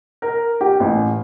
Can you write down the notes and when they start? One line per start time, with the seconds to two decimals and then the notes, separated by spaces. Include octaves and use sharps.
0.22 A#4
0.61 G4
0.80 A1